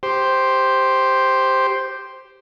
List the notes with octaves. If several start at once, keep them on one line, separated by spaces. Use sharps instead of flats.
G4 C5